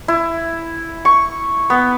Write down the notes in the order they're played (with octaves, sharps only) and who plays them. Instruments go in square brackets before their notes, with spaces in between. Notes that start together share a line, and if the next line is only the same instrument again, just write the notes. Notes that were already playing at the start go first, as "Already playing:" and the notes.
[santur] E4
C#6
B3